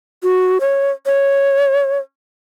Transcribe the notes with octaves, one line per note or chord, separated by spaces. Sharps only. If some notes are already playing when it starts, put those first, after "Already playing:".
F#4
C#5
C#5